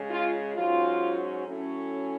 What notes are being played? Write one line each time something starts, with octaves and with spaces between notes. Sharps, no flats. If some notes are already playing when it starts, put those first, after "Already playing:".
Already playing: C#3 G#3
F4
G#2 F#3 C#4 F4
A2 F#3 A3 C#4